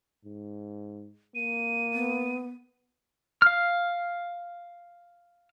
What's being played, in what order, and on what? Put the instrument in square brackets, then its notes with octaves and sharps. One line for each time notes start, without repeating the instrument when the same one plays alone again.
[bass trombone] G#2
[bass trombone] A#3 [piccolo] D#7
[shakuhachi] B3
[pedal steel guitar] F5 F6